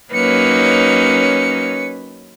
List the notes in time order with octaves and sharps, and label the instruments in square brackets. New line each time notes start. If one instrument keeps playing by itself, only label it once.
[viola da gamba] F#3 A#3 D#4 [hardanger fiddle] C#4 B4 [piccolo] C#7